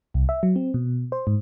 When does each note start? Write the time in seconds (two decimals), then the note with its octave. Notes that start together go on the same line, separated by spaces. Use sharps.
0.14 C2
0.29 E5
0.43 F#3
0.56 C4
0.74 B2
1.12 C5
1.27 G#2